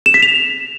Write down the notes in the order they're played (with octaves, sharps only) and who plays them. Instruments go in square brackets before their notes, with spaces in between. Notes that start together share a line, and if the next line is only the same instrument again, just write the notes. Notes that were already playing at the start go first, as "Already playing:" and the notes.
[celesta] E7
B6
F7